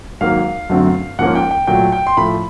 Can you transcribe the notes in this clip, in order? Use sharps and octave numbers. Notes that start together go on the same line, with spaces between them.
G#2 D#3 F#3 A#3 F5
F#2 D3 F#3 A3 C4
G#2 F3 A#3 C#4 F#5
G5
G5
A#2 F#3 A3 G5
G5
C6
A2 F3 A3 B5